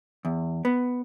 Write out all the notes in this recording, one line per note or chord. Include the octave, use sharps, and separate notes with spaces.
E2
B3